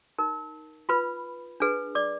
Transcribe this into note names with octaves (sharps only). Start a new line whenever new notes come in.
D#4 A#4
F4 B4 B5
D4 G#4 B4
D5 D6